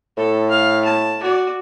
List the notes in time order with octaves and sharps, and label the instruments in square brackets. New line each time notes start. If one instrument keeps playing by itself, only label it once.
[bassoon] A2 [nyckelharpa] A4
[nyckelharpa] F5
A5
F#4 D5